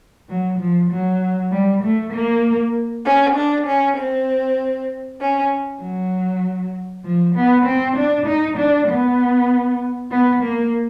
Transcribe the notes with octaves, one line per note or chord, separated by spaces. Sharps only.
F#3
F3
F#3
G3
A3
A#3
C#4
D4
C#4
C4
C#4
F#3
F3
B3
C4
D4
D#4
D4
B3
B3
A#3